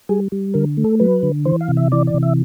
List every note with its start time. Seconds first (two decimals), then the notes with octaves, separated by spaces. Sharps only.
0.09 G3 G#4
0.32 G3
0.54 D3 A#4
0.77 A3
0.84 A4
1.00 F#3 B4
1.23 D3
1.45 E3 C5
1.61 F5
1.68 C3
1.77 E5
1.92 E3 D5
2.07 D5
2.14 C3
2.23 E5